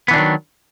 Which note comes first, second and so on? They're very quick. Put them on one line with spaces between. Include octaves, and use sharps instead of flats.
B3 E3 D4 D#3 F#3